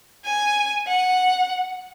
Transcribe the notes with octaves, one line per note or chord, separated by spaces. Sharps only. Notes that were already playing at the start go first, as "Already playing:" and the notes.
G#5
F#5